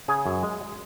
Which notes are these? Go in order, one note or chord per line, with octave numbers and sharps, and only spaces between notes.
C#3 G#4
F#2
G#3